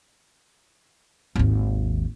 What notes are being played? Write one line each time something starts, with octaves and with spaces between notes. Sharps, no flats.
G#1 D#2